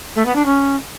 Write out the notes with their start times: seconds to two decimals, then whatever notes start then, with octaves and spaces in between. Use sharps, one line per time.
0.15 A3
0.25 B3
0.35 D4
0.45 C#4